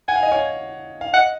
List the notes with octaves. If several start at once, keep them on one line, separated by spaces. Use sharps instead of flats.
F#5 G#5
F5
D#5
C#5 F5
F5
D#5 F#5